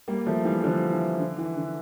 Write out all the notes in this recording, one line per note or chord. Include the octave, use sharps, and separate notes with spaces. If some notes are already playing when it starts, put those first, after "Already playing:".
G3 A#3
F3 A3
E3 G3
D3 F3
E3
D3
E3
D3